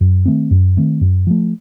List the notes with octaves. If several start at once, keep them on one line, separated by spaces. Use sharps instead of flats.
F#2
D#3 A3 C4
F#2
D#3 A3 C4
F#2
F3 A3